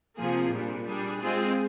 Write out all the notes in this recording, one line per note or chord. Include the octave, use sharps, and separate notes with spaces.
C3 F3 A#3 F4 G#4
A#2 G3 D4
G3 D4 G#4
G#3 C4 F4 G#4